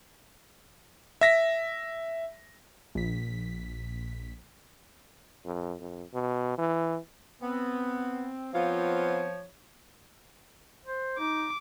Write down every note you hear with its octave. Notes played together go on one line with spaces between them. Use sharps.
E5 A#6 B6
A#1 B6
F2
F2
B2
E3
B3 C4
F3 B3 C4 F4 C#5
C5
D#4 D6